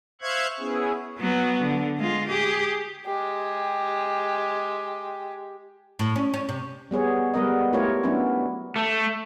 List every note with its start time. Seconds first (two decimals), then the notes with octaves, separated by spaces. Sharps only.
0.21 C5 E5 F5 C#6 F#6 G#6
0.59 B3 C#4 E4 G#4
1.18 F#3 B3
1.61 D3
1.98 G#3 F4
2.29 G4 G#4
3.06 G#3 G4
5.99 A2
6.16 C#4
6.34 C#4
6.49 C3
6.91 G3 B3 G#4 C#5
7.34 G3 G#3 B3 A#4 B4 D#5
7.73 A3 E4 F4 G4 A#4 C#5
8.03 F#3 B3 C#4 D4 E4
8.76 A3